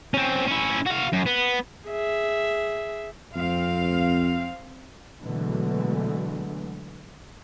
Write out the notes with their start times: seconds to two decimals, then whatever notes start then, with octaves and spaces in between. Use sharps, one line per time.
0.14 C4 C#4
0.48 C#4 E4
0.86 F#4 F5
1.13 F#2
1.27 B3
1.87 G#4 E5
3.35 F2 C4 F5
5.22 B2 D3 E3 F#3 G#3 A3